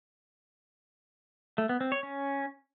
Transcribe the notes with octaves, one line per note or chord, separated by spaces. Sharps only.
A3
B3
C4
C#5
C#4